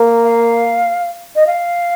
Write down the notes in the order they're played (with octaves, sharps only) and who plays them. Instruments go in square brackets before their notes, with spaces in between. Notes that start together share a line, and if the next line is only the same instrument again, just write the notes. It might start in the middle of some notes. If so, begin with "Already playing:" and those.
Already playing: [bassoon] A#3
[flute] F5
D#5
F5